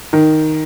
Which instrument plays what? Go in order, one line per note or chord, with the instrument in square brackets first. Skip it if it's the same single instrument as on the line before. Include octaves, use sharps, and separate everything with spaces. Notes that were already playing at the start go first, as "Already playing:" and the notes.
[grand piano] D#3